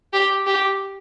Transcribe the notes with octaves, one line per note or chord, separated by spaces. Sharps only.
G4
G4